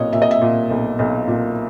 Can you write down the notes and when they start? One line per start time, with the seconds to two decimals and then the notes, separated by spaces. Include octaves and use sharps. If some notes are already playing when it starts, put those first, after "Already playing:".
Already playing: B1 A#2 C#5 D#5
0.13 A#2 E5
0.22 D#5
0.31 E5
0.42 A#2
0.70 B1
0.99 B1
1.28 A#2